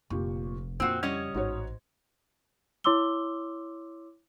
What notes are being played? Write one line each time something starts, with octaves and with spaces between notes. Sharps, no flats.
F1 A#2 G4 C#6
F2 A#2 C#3 C4 F#4
G3 C#4 D#5 G#6
A1 G#2 F#4 C#5
E4 C#5 C6 D6 E6 G7